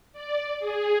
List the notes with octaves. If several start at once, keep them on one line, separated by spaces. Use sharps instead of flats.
D5
G#4